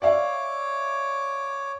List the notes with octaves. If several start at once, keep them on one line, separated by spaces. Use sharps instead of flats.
C#5 D5 E5 F5 D6